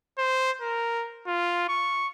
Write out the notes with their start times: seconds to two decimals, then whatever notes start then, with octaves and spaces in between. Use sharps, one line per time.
0.18 C5
0.61 A#4
1.27 F4
1.69 C#6